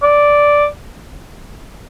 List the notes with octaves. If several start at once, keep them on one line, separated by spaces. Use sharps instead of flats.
D5